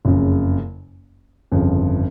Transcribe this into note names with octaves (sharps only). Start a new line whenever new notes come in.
F#1 F2 C#3
G1 F2 C#3